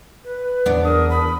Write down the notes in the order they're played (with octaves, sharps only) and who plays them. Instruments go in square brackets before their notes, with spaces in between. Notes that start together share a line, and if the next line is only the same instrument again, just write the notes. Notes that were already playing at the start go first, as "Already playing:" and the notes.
[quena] B4
[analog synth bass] E2 [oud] B3 D4
[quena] A#4 [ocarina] D#6
[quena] B5